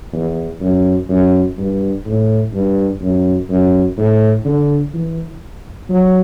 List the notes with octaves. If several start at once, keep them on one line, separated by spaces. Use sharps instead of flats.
E2
F#2
F#2
G2
A2
G2
F#2
F#2
A2
D3
E3
F#3